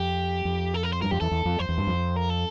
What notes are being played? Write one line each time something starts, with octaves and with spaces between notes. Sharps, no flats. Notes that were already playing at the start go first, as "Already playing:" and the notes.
Already playing: F2 G4
F2
A4
A#4
C5
G2 A#4
F2 G4
E2 A4
E2
F2
F2 C5
E2
G2
F2
A#4
A4